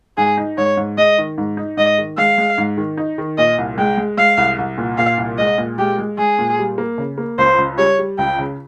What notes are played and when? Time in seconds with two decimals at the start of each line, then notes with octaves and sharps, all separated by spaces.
0.17 G#2 G#4
0.38 D#4
0.58 G#2 C#5
0.77 G#2
0.98 G#3 D#5
1.18 D#3
1.38 G#2
1.57 D#4
1.77 G#2 D#5
1.98 D#3
2.18 G#3 F5
2.38 G#3
2.58 G#2
2.77 D#3
2.97 D#4
3.18 D#3
3.38 A#2 D#5
3.58 C2
3.78 G#3 G5
3.98 G#3
4.17 G#3 F5
4.38 C2
4.58 C2
4.78 A#2
4.98 A#2 F5
5.17 C2
5.38 G#3 D#5
5.58 A#2
5.78 G#3 G4
5.98 G#3
6.18 G#3 G#4
6.39 A#2
6.59 G3
6.78 A#3
6.98 C#3
7.18 A#3
7.38 C#2 C5
7.58 C#2
7.78 G3 C#5
7.99 G3
8.18 C#2 G5
8.39 C#3